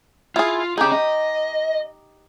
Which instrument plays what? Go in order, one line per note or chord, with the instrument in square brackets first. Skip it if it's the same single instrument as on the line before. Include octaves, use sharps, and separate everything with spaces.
[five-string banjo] E4 G#4 [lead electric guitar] F4
[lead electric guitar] C#4 G#4 [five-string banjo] D#4 G4
[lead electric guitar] D#5